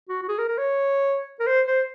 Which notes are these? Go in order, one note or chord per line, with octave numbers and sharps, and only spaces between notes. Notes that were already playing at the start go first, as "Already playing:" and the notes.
F#4
F#4
G#4
A#4
A#4
C#5
A#4
C5
C5